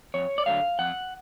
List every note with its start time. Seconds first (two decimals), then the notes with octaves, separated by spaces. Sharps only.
0.14 F2 C#5
0.38 D5
0.46 D3 F#3 A3 F5
0.79 F2 F#5